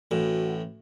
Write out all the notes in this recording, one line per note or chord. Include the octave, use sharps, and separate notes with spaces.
A1 A2 F#4